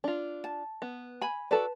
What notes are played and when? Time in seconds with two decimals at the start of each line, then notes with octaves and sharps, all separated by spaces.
0.04 D4 F4
0.44 A5
0.82 B3
1.21 G#5 B5
1.51 F#4 A4 B4 D5 A5